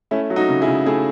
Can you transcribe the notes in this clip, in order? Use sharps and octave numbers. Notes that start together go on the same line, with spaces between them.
A3 C#4 E4
F#3
D#4 F#4
C#3
E4 G#4
C#3
A3 E4 G#4